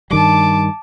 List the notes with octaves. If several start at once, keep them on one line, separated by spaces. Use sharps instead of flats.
G2 D#3 G3 A5 D6